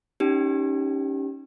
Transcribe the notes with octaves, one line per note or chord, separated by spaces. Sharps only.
C#4 D#4 G4